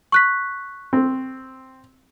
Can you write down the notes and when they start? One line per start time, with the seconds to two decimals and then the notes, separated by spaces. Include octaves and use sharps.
0.12 C#6 F#6 B6
0.93 C4